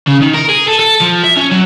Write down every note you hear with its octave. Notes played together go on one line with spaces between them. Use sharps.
C#3
D#3
A#4
G#4
A4
A4
F3
E5
C#4
F#3